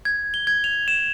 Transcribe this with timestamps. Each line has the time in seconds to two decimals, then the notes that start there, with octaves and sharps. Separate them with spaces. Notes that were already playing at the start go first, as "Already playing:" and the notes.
0.05 G#6
0.34 G7
0.47 G#6
0.64 F7
0.88 E7